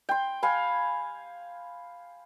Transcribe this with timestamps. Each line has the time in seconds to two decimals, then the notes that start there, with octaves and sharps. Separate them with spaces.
0.09 G5 C6
0.43 F5 G#5 B5